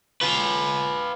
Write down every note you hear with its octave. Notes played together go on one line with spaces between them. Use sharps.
F4 B4